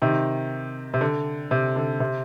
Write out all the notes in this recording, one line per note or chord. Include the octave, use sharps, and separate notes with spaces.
C3 D#3
C3
D3
C3
D3
C3